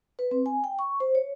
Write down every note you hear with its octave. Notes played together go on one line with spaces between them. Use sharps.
B4
C4
G#5
G5
C#6
C5
C#5